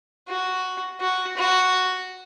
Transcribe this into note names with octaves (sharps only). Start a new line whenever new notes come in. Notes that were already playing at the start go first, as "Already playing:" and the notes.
F#4
F#4
F#4